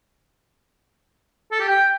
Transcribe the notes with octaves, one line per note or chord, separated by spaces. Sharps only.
A4
G4
G5